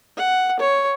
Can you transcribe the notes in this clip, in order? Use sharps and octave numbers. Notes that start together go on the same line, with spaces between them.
F#5
C#5